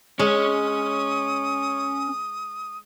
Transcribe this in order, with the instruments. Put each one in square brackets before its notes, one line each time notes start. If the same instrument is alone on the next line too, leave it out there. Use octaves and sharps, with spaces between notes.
[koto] G#3 [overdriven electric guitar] C#4 C#5 [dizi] D#6